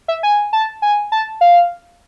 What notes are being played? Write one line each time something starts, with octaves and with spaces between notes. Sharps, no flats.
E5
G#5
A5
G#5
A5
F5